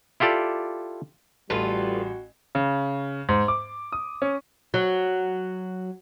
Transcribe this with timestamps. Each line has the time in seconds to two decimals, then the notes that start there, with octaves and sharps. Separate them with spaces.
0.20 E4 F4 G4 A4 D5
1.50 A1 G3 F4 F#4 A4 B4
2.55 C#3
3.29 G#2
3.48 D6
3.92 D#6
4.22 C#4
4.74 F#3